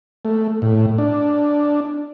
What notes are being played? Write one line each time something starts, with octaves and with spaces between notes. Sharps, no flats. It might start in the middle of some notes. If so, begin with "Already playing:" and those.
A3
A2
D4